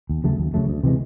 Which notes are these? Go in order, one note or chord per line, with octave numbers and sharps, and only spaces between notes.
D#2
C#3 F#3 A3
D#2
C#3 F#3 A3
D2
C3 E3 G#3